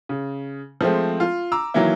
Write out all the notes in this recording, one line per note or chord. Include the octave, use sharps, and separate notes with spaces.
C#3
F3 G#3 A3 C4
F4
A#5 D6 E6
D#3 E3 F#3 A#3 E4